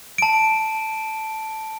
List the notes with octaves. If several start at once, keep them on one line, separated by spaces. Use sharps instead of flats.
A5 D7